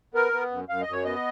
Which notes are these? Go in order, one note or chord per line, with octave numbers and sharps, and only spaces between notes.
B3 A#4
B3
F#2
F#2 F5
D#5
F#2 C#5
B3 D#5